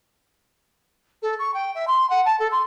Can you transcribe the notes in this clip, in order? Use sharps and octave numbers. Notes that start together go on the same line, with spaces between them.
A4
C#6
G5
E5
C6
F#5
A5
A4
C6